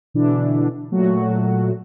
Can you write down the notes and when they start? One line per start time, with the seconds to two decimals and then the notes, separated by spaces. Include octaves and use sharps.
0.14 B2 D3 E3 D4 E4
0.91 A#2 F#3 A3 F#4